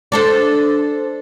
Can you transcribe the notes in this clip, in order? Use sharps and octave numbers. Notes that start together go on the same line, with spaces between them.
D4 A4 C5